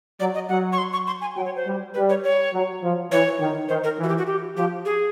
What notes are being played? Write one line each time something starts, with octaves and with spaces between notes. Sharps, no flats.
F#3 D5
D#5
F#3 F#5
C#6
C6
C#6
C6
G#5
F#3 G5
C#5
C5
G3
G3 B4
C#5
C#5
F#3
F3
E3 C#5
D#3
D#3 C5
A#4
E3
F#4
G4
F#4
G4
F3 G4
G#4